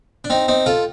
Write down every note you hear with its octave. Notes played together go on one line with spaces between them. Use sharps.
D4
C4 D#4
C4 D#4
F4 A4